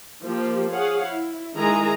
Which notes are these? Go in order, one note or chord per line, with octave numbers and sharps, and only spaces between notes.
F3 A#3 G4
G#4 C#5 F5 F#5
E4
D#3 G#3 E4 G#4 A#5